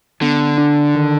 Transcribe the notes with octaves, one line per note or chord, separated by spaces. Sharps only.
D3 B3
D4
D#3